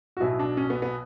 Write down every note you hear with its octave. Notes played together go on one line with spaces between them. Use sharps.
F#4
B1 B2 F#3 E4
D4
C#4
B3
B3